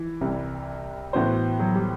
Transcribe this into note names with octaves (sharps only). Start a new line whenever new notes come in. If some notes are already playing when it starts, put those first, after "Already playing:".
Already playing: E3
C2 C3 G3
A2 E3 B3 F#4 C5
F#3
G3